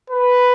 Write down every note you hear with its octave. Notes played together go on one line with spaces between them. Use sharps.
B4